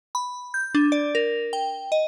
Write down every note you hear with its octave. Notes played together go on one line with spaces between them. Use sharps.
B5
G6
D4
D5
A#4
G5
D#5